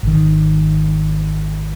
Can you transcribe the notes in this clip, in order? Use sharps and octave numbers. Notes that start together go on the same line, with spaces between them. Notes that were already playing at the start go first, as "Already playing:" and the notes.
G#1 D#3